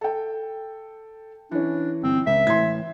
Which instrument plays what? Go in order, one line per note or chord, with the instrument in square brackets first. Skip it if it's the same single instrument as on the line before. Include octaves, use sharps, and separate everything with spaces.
[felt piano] A4 G5
[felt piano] E3 C#4 [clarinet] D4
[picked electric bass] G1 [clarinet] C4
[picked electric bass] C#2 [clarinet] E5
[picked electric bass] A2 D#3 E3 [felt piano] C6 G#6